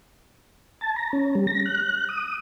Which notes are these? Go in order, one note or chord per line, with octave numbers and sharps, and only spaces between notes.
A5
A#5
C#4
G3
A#6
F#6
D#6